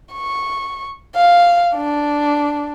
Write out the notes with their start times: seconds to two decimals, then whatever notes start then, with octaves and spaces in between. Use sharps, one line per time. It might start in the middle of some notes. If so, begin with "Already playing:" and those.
0.13 C#6
1.15 F5
1.75 D4